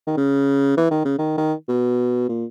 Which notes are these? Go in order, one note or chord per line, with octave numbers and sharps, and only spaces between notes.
D#3
C#3
E3
D#3
C#3
D#3
D#3
B2
A#2